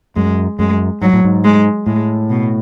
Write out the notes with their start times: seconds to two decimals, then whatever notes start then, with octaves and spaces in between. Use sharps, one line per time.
0.16 F#2 G#3
0.59 F#2 G#3
1.02 G#2 F#3
1.13 A2
1.24 G#2
1.44 G#3
1.86 A2 G#3
2.29 B2